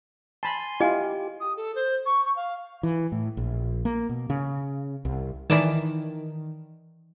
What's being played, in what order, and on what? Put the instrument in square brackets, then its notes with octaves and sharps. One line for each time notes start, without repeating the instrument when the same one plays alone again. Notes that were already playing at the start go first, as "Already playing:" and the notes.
[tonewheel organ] G#5 C6 [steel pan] A5 B5
[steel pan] E4 F4 [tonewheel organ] G4 [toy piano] D#5 G#5
[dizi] D#6
A4
C5
C#6
C#6
F5
[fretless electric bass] E3
A2
A#1
A#3
B2
C#3
C2
[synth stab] D#3 [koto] E3 D5 A5